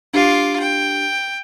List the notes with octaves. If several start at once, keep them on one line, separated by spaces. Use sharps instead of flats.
D4 F4 G4 D6 C7
G5